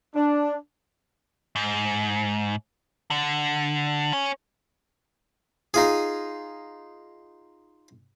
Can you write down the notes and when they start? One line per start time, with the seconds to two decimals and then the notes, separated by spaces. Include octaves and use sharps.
0.16 D4
1.56 G#2
3.11 D3
4.13 C#4
5.74 D#4 F4 G#4